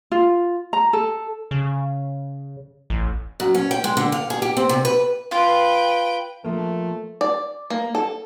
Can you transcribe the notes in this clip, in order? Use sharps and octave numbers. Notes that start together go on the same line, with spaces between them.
F4
A#5
A4
C#3
A1
F#2
C#4
G5
G#3
D3
F5
G#4
G4
C4
C3
B4
F4 B4 F5 G5
F3 A3 A#3
D5
A#3
A4